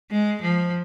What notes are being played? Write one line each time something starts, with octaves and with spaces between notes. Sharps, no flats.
G#3
F3